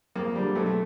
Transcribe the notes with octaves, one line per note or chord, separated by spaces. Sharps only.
F2 A#3
D3 G3
B1 A3
A3